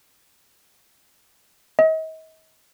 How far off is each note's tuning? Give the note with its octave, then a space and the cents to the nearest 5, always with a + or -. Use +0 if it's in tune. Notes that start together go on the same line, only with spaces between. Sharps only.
D#5 +40